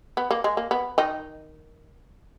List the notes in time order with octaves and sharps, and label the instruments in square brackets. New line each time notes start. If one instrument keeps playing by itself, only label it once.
[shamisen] B3
A#3
G#3
A#3
B3
D#3 D#4